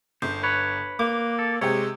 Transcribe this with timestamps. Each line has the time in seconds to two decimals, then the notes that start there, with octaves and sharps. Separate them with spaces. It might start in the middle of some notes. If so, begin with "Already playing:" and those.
0.22 G1 C5
0.43 B4 C#5
0.99 A#3 D6
1.39 A4
1.61 C3 G#3 G4 C#5